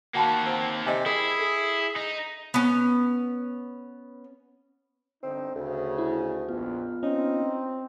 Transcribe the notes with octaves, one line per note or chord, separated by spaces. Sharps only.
D#3 A#3 F#4 G5 A5 B5
C4
C3 D#5 G5 G#5
E4 G#4 A#4
A4
D#4
B3 C#4
G1 D3 C4 D#4
D2 C#3 A3
E4
A#1 F2 B3 F4
C4 C#4 D#4